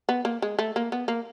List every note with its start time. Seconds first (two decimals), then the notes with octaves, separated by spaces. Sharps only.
0.09 B3
0.25 A#3
0.42 G#3
0.59 A3
0.76 A#3
0.92 B3
1.08 A#3